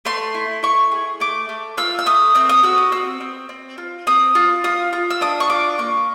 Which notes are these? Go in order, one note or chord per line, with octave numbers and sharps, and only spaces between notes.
A3 C6
E4
E4 C#6
G#4
A3 D6
A3
F4 E6
E6
A3 D#6
C4 E6
D#6
F#4 E6
D#6
C4 E6
C4
C4
F4
C4 D#6
F4
F4 D#6
F4
E6
D4 D#6
C#6
F4 D6
A#3 C#6